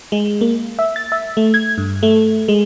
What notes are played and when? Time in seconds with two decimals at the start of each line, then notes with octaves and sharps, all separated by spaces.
0.12 G#3
0.41 A#3
0.79 E5
0.96 A6
1.12 E5
1.37 A3
1.54 G#6
1.78 G2
2.03 A3
2.48 G#3